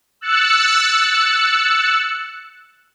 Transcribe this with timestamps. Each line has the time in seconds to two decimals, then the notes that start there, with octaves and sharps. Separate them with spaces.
0.21 E6 F#6 A6 C#7